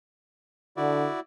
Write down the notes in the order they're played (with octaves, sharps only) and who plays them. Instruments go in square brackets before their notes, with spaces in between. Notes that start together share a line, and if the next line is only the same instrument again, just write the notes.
[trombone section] D3 [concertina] E4 F#4 D5